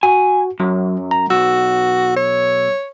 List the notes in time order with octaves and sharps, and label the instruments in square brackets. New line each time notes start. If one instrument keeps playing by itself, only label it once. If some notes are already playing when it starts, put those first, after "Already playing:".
[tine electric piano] F#4 [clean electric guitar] G#5
[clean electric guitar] F#2 [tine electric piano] F#3
[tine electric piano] A#5
[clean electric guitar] B1 [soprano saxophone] F#4 [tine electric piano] E6
[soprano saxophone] C#5